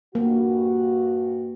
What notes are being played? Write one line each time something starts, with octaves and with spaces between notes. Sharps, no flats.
G2 A#3 F#4